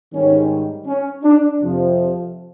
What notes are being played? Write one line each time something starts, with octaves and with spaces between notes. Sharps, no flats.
G#2 D#3 G3 C#4
C#4
D4
F2 C3 F3